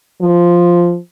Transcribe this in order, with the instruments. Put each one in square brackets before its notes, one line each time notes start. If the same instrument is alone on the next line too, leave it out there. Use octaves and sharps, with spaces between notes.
[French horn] F3